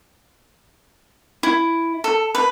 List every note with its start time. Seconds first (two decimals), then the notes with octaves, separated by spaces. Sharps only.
1.43 E4
2.04 A4
2.35 B4